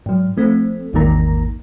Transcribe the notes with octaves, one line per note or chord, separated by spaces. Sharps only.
G#2 F#3
F3 A3 C4
A1 E2 G#2 D#3 A#3 A#5